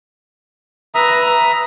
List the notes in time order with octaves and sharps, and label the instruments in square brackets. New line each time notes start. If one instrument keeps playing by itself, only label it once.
[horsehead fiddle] B4 [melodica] E5 A#5 D#6